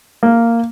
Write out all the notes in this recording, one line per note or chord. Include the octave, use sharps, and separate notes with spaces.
A#3